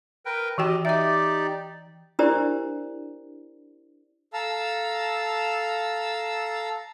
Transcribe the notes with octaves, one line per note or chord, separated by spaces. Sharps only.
A#4 B4 G5
E3 F#4 G4 D#5 G5
D#4 G4 D5 E5 D6
D4 E4 G4 A#4 C5 D5
A4 F5 A5 A#5 E6